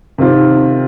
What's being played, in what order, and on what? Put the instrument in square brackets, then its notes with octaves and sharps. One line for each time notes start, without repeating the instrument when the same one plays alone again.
[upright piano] C3 D#3 C4 F4